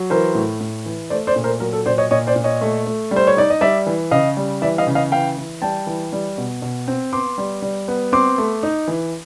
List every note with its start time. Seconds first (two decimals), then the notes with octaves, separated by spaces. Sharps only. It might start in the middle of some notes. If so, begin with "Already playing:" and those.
Already playing: F#3
0.10 E3 A#4 C5
0.35 A2
0.60 A2
0.86 E3
1.10 A3 C5 D5
1.27 C5 D5
1.36 A#2
1.44 A#4 C5
1.60 F#3 A#4
1.73 A4
1.86 A#2 C5 D5
1.98 C#5 D#5
2.11 A#2 C#5 D#5
2.27 C5 D5
2.36 A#2
2.44 C#5 D#5
2.61 A3
2.86 A3
3.11 G3
3.16 C5
3.27 C#5
3.37 D#4 D5
3.50 D#5
3.61 G3 D5 E5
3.86 E3
4.11 C#3 D#5 F5
4.37 G3
4.62 E3 D5 E5
4.78 D#5 F5
4.87 C#3
4.95 D#5 F5
5.12 E3 F5 G5
5.37 E3
5.62 G3 G5 A5
5.87 E3
6.13 G3
6.38 B2
6.62 B2
6.88 C4
7.12 B3 C6 D6
7.38 G3
7.62 G3
7.88 B3
8.12 C4 C6 D6
8.38 A3
8.63 D#4
8.88 E3